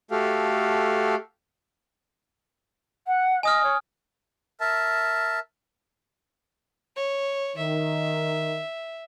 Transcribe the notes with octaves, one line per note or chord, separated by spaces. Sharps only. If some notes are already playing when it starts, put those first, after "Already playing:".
A3 F#4 G4 A4 F5
F#5
D#5 G#5 D#6 F6
C#5
A#4 E5 A5
C#5
D#3 E5